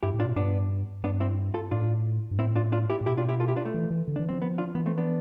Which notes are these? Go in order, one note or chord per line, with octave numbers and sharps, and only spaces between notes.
G2 E4 G4
A2
D4 F4
B2
G2 B3 D4
G2 B3 D4
C4 E4
F4 A4
A2 D4 F4
G2
A2 C4 E4
D4 F4
D4 F4
E4 G4
A2
B2 E4 G4
D4 F4
E4 G4
F4 A4
E4 G4
D4 F4
A3
E3
E3
D3
E3 D4
F3 C4
B3
D4 F4
E3 B3
A3 C4
B3 D4